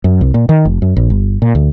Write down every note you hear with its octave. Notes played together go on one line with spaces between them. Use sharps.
F#2
C2
A#2
D#3
F1
F#2
A#1
G1
A#2
D2